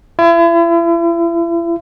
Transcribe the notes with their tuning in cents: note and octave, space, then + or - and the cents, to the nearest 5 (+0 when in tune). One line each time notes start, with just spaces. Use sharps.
E4 +40